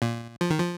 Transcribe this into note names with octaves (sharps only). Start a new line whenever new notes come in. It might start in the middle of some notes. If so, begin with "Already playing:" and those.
A#2
F3
D#3
F3